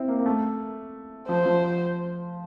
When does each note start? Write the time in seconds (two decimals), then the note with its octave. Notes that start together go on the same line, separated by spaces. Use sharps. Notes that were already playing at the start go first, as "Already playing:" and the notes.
Already playing: C4 E4
0.08 A#3
0.19 A#3
0.26 A3
1.29 F3 C5
1.46 F3